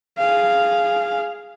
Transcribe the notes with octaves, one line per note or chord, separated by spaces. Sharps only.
G#4 F5